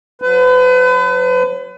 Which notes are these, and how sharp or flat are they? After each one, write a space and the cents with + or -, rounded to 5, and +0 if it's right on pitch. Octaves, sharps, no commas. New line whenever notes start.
F#3 -20 B4 +35